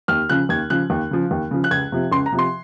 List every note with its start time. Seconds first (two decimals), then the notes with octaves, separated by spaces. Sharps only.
0.08 D#2 F6
0.29 C#3 F3 F#6
0.49 D#2 G#6
0.70 C#3 F3 F#6
0.90 D#2
1.11 C#3 F3
1.31 D#2
1.51 C#3 F3
1.64 F#6
1.71 C#2 G#6
1.92 C3 F3
2.12 C#2 C6
2.26 A#5
2.32 C3 F3
2.39 C6